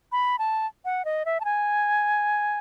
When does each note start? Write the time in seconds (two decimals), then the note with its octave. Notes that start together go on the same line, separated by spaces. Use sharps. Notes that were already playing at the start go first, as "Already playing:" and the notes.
0.12 B5
0.39 A5
0.85 F#5
1.05 D#5
1.25 E5
1.40 A5
1.45 G#5